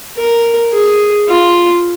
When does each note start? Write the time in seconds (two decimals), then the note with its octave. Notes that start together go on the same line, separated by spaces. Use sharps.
0.17 A#4
0.73 G#4
1.29 F4